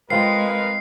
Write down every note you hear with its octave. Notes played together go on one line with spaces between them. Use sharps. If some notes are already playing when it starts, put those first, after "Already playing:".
G#3 C4 F4 A#4 B4 F5 G5 C7